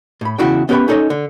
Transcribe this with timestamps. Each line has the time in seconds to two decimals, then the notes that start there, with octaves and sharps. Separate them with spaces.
0.21 A2 B5
0.38 E2 C#3 E4 F#4 G5
0.69 B3 C#4 G4 B4 E5 B5
0.88 C#4 D#4 A4 C#5 D#5
1.10 D3